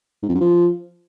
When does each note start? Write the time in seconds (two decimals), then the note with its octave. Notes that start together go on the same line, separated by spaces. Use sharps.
0.23 G#2
0.29 F2
0.35 F#2
0.41 F3